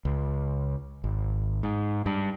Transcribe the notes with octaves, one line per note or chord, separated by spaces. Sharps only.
C#2
G#1
G#2
G2